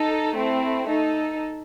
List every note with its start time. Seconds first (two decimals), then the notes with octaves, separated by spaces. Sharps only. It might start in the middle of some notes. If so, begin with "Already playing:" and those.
Already playing: D#4 A4
0.34 A3 C4 E4
0.88 D#4 A4